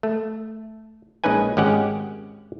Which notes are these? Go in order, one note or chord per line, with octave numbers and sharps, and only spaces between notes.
A3
A#1 G#3 C#4 D#4 B4 G#5
G#1 G#3 C#4 G4 F#5